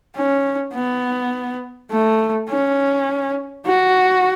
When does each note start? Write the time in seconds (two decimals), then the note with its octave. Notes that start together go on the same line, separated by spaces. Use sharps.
0.16 C#4
0.74 B3
1.91 A3
2.50 C#4
3.66 F#4